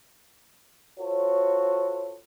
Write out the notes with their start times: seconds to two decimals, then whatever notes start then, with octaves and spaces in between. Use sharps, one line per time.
0.98 F4 F#4 A4 C5 C#5